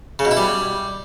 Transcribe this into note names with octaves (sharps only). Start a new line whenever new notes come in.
C#3
B2
E4
G3